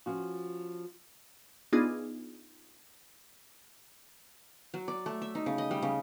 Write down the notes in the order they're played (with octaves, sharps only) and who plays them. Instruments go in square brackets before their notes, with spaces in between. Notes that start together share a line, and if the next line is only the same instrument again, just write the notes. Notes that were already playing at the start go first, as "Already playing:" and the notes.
[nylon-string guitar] F3 C#4 F#4
[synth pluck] B3 D4 D#4 F4 G#4
[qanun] F#3
D5
A3
E5
D#4
C#3
D#5
G3
C#3